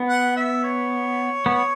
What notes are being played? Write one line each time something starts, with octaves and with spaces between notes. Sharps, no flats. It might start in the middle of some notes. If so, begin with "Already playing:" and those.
Already playing: B3
F#5
E5
C#5
B3